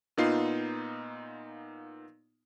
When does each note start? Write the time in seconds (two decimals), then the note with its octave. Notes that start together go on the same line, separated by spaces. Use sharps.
0.17 A#2 B3 D#4 F4 C7